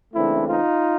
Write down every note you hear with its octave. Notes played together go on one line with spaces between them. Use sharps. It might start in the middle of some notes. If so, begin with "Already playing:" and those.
C#2 C#3 E3 A3 C4 D4 E4
D#4 F4